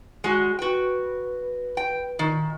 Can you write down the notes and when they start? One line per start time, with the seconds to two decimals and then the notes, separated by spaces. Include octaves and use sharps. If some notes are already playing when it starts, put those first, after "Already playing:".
0.24 G3 G#3 F#4 G#4
0.59 F#4 B4 G5
1.77 G5
2.19 A#2 D#3